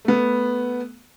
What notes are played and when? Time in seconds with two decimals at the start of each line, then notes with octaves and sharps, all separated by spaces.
0.05 A3 B3